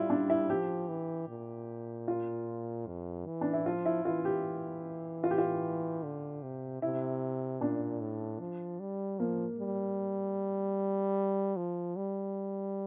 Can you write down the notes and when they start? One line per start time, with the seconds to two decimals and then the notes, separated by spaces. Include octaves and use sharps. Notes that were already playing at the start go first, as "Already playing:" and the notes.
Already playing: G3 E4 F4
0.10 D4
0.30 E4
0.49 F3 G4
0.88 E3
1.28 A#2
2.08 F4
2.87 F2
3.26 E3
3.41 D4
3.53 E4
3.66 F3 F4
3.86 E4
4.05 E3 F4
4.25 G4
5.24 F4
5.31 G4
5.38 F4
6.03 D3
6.43 C3
6.82 C3 E4
7.61 A#2 D4
8.01 A2
8.40 F3
8.80 G3
9.20 F3 A#3
9.59 G3
11.57 F3
11.96 G3